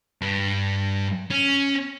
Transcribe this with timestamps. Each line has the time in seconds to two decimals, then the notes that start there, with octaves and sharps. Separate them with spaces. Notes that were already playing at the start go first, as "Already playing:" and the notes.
0.22 G2
1.30 C#4